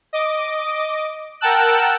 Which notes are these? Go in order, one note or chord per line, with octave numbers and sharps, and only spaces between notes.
D#5 D6
A#4 F#5 G5 A5 E6 F#6